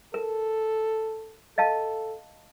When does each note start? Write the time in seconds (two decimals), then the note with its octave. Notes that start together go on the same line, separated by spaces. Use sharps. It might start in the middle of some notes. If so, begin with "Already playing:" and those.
0.14 A4 A#4
1.58 A4 D#5 F5 A5